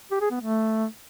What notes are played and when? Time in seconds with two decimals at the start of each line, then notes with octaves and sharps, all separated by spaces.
0.11 G4
0.21 G#4
0.31 B3
0.40 A3